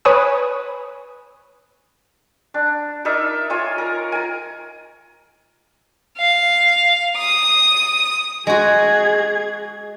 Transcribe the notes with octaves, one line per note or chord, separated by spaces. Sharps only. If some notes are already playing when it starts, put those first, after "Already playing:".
B4 C#5 G#5 D#6
D4
D#4 A#4 D5 E5
F4 C#5 G#5
A#4
G#5 A#5
F5
D#6
G#3 F#4 G#4 G#6